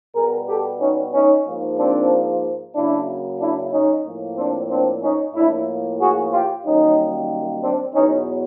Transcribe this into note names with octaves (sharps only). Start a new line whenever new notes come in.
B2 G3 B3 G#4 A#4
G4 A4
C#4 D#4
C#4 D#4
G#2 F3 A#3
C4 D4
F#2 C#3 F#3 A#3 D4 E4
D4 E4
C#4 D#4
A2 F3 A#3
C4 D4
C4 D4
C#4 D#4
A2 F3 A#3 D4 E4
F#4 G#4
F4 G4
F#2 D#3 G3 A#3 C#4 D#4
C4 D4
E2 B2 F#3 B3 C#4 D#4